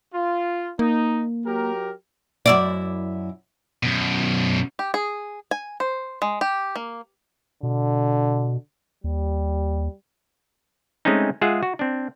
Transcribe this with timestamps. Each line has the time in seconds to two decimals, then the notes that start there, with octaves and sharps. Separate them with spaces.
0.13 F4
0.79 A#3 D#4
1.45 F#3 G4 A#4
2.46 F#2 E4 D5
3.83 F#2 B2
4.79 G4
4.94 G#4
5.51 G#5
5.80 C5
6.22 G#3
6.41 G4
6.76 A#3
7.63 B2 D3
9.04 D#2 G3
11.05 G#3 A3 C4 C#4 D#4
11.41 G#3 F4 G#4 E5 F#5
11.63 F#4
11.79 C4 D4